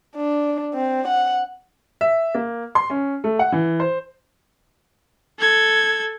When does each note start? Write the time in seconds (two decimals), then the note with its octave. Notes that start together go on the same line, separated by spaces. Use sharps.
0.16 D4
0.74 C4
1.08 F#5
2.01 E5
2.34 A#3
2.75 C6
2.90 C#4
3.24 A3
3.39 F#5
3.52 E3
3.80 C5
5.39 A4 G#6